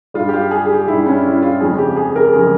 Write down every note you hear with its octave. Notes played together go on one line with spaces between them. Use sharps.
G2 G3 F4
G4
F4
G#4
G#4
G4
G2 G3 E4
C#4
E4
F4
F2 C#3 F3 G#3 G#4
G4
G#4
A#4
C#3 F3 G#3 G#4